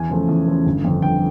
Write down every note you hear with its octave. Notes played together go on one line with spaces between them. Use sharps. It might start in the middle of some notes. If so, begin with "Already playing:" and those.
Already playing: E2 G#5
C#3 F3 A3
E2
C#3 F3 A3
G1
F2 D3
G1 G5